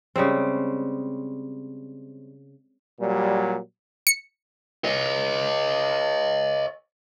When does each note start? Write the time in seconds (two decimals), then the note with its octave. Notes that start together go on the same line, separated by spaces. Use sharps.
0.16 C#3 G3 G#3 C4
3.00 A#2 F#3 G3
4.07 C#7
4.84 C#5 D#5